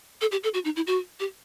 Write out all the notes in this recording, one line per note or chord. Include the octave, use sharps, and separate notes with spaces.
A4
G4
A4
F#4
D#4
E4
F#4
G4